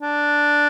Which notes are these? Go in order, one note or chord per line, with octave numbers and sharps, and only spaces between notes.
D4